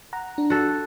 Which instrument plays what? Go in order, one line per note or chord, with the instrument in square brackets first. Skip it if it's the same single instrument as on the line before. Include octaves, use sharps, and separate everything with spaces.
[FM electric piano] F#5 A#5
D4
[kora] F#4 A4